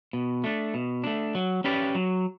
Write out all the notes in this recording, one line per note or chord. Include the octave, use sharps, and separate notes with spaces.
B2
A3 D4
B2
A3 D4
F#3
C#4 G4 B4 D5
F#3